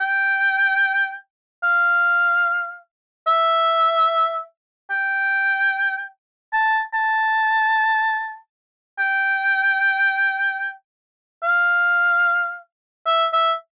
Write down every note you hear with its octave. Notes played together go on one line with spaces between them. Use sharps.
G5
F5
E5
G5
A5
A5
G5
F5
E5
E5